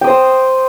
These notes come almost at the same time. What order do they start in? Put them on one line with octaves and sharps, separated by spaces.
G5 D#6 C5 E6